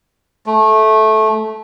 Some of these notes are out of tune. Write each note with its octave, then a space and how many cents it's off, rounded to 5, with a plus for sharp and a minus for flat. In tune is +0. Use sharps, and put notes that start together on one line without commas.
A3 -15